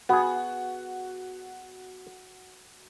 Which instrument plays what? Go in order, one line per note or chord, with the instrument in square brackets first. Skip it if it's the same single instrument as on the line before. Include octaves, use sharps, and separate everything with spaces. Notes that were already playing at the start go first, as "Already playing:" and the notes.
[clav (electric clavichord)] B3 G#4 [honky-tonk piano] F#4